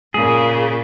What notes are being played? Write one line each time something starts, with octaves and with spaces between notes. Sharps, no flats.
A#2 C#3 G#4